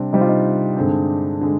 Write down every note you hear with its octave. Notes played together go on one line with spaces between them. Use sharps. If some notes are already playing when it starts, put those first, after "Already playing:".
Already playing: C3 G3 C4 D4
C3 G3 C4 D#4
F4
D#4
G2 D3 G#3 C4
D3 G#3